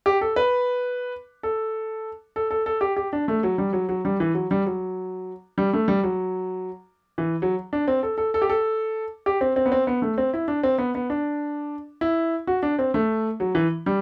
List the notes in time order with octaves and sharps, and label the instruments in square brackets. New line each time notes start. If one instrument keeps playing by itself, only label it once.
[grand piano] G4
A4
B4
A4
A4
A4
A4
G4
G4
D4
A3
F#3
G3
F#3
F#3
G3
E3
F#3
G3
F#3
G3
A3
G3
F#3
E3
F#3
D4
C4
A4
A4
A4
G4
A4
G4
C4
C4
B3
C4
B3
A3
C4
E4
D4
C4
B3
B3
D4
E4
F#4
D4
C4
A3
F#3
E3
G3